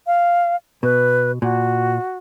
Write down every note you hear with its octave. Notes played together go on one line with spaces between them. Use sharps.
F5
B2 B4
A#2 F#4